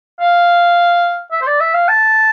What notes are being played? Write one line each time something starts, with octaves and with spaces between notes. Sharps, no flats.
F5
E5
C5
D5
E5
F5
A5